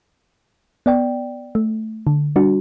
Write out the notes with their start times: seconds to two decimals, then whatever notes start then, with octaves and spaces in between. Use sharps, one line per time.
0.86 B3 D5 G5
1.55 A3
2.07 D3
2.36 G3 D4 F#4